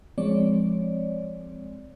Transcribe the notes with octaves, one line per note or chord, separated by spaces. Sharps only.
F3 G#3 C4 C#5 D5